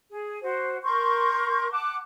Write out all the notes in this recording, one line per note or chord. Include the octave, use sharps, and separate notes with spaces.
G#4
F#4 C5
A#4 C6 C#6 G6
F#5 A5 D6 F#6